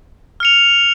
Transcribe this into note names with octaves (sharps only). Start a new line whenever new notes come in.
F6 C#7 F7